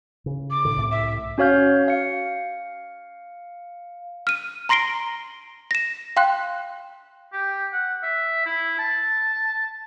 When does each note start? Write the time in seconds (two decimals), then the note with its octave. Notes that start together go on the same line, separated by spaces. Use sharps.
0.26 C#3
0.51 D6
0.65 A2 D3
0.76 C2 A2
0.91 E5
1.38 C#4 F#4 C#5 F5 F6 G6
1.88 F5 C#7
4.27 F6 D#7
4.69 A#5 C6 A#6 C7 D7 G7
5.71 A#6 E7
6.17 F5 G5 C6 F#6
7.33 G4
7.73 F#5
8.03 E5
8.46 E4
8.79 A5